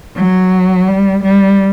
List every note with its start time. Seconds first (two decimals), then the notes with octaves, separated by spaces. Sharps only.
0.17 F#3
0.88 G3
1.24 G3